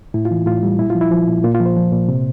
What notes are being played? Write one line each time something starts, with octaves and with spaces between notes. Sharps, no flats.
A2 E4
F4
E3
A2 F4
G3
A#2 E4
F4
F3
E4
F3
A#2
A#2 F4
F4
F3
C5
F3
A#2
C3